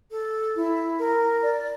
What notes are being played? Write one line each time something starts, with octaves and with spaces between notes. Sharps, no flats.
A4
E4
A#4
D5